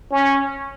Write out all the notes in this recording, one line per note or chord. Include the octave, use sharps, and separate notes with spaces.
C#4